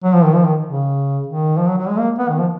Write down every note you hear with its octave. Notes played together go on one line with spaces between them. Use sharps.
F#3
F3
D#3
F3
D#3
C#3
D#3
F3
F#3
F#3
G#3
A#3
B3
D#3
F3